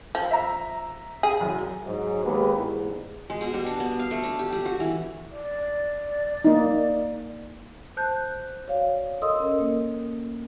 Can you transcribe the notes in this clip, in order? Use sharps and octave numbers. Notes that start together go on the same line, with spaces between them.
F3
E5 A#5
G#4
C2 F#2
G#2 F#3
D#2 G#3 B3 A#4 B4
E2 G#2
G#3
B2
G3
D4
B3
F5
A3
D4
G4
G3
F#4
E3
D5
A#3 D#4
C5 A5 F#6 G6
F#4 C#5 D5 F5
A4 A#4 D#5 C6 D#6 E6
C#4 A#4 D#5
A#3